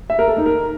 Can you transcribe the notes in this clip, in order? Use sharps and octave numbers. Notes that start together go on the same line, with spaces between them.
E5
A#4
A4
D#4
A#4